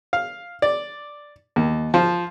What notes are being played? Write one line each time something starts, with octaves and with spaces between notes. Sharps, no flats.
F5
D5
D#2
F3